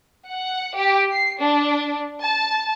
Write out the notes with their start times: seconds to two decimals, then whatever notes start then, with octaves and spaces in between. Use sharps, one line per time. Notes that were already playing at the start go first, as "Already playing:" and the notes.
0.29 F#5
0.76 G4
1.11 C7
1.41 D4
2.22 A5